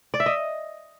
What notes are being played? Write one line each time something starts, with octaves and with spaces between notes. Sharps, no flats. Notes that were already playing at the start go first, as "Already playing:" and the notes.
D5
E5
D#5